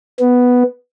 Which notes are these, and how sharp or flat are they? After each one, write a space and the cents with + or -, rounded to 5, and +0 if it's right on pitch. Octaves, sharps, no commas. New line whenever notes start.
B3 +0